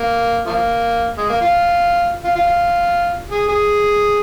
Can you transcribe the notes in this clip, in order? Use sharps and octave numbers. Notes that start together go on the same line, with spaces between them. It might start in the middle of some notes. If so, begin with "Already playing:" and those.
Already playing: A#3
F3 A#3
G#3
A#3
F4
F4
F4
F4
G#4
G#4